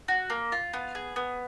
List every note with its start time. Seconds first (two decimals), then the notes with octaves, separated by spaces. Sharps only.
0.08 F#4
0.30 A#3
0.52 F4
0.73 B3
0.95 G#4
1.16 B3